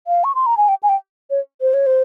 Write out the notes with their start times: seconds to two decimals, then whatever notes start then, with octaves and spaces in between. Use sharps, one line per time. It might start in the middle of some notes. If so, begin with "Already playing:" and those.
0.07 F5
0.24 C#6
0.35 C6
0.46 A#5
0.57 G#5
0.68 G5
0.83 G#5
0.89 G5
1.30 C#5
1.61 C5
1.74 C#5
1.86 C5